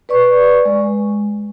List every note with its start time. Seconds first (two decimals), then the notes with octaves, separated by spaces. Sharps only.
0.09 B4 D5 C#6
0.65 G#3